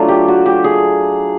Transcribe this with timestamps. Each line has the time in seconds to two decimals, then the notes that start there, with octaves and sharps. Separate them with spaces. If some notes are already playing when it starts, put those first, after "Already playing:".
Already playing: F#3 A3 D4 F4
0.08 G4
0.28 F#4
0.46 G4
0.64 G#4